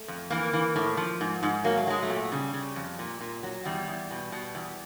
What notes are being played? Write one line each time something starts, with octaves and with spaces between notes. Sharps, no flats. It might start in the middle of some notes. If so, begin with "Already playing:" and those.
Already playing: A3
F2
E3 A#3
E3
A2
F3
G#2
G#2
F#3 A#3
A3
F#3 G#3
A3
A#2
C#3 G3
C#3
F2
A#2
A#2
F#3
E2 G3
E2
B2
B2
E2